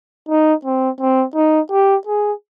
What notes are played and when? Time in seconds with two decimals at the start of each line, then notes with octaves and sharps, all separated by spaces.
0.29 D#4
0.65 C4
1.00 C4
1.35 D#4
1.71 G4
2.07 G#4